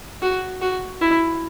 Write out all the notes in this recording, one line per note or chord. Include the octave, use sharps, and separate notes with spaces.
F#4
F#4
E4